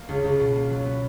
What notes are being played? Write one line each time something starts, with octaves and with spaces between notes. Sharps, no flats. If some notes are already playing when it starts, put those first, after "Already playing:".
Already playing: A#3
C#2
C#2
B2
A#3
F#3
B3